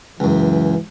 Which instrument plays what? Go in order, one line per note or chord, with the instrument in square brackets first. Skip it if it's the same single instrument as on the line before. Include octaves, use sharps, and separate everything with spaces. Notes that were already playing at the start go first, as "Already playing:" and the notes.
[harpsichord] C#2 F#2 [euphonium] E3